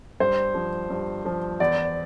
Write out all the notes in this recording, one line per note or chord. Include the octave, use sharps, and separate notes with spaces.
G2 C5
F3
G2
F3
E2 D5